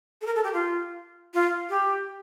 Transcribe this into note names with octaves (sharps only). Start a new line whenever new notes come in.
A4
A#4
A4
G4
F4
F4
G4